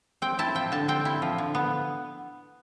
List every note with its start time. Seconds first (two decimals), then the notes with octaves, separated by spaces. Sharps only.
0.22 C4 G5
0.39 E4 A5
0.55 F3 G5
0.72 D3 A5
0.88 C4 G5
1.05 E4
1.22 F3
1.38 D3
1.55 B3